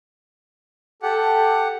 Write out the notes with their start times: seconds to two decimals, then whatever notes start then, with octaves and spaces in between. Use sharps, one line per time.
1.03 G4 A4 F#5